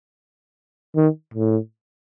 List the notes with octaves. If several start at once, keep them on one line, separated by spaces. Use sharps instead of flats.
D#3
A2